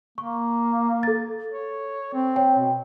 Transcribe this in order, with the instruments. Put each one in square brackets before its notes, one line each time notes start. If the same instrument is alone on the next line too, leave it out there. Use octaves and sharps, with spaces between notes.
[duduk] A#3 [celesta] C#6
[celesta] A4 A6
[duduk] C#5
C4
[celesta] C#5 G5
[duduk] B2